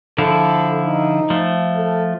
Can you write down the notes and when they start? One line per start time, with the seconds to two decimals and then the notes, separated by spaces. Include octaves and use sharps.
0.18 D3 F3 E4 A4
0.86 D#4
1.30 F3 A3
1.77 A4